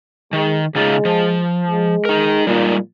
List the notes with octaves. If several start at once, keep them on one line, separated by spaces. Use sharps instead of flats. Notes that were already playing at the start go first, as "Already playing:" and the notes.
D#3 G#3
C#3 G#3 D#4 F4
F3
G#3
D#4 A#4
A#2 G3 G#3 D#4